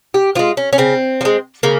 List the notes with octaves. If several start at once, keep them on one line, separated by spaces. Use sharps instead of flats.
G4
F3 G#3 F4
C#4
C#4
C#3 C4
F3
G#3
C#3 A#3